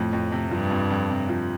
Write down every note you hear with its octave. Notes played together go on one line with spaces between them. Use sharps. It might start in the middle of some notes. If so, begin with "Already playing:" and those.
Already playing: F2 A2 F3
F2
C3
G2 F3
F2
F2
C3
F3